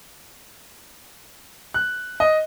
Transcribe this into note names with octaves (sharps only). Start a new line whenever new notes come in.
F#6
D#5